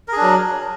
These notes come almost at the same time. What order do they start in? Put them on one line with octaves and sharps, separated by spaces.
A#4 G#4 D4 F#3